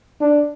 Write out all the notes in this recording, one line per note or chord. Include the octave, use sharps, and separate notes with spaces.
D4